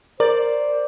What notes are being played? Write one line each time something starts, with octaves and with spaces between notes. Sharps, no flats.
A#4 C5 D5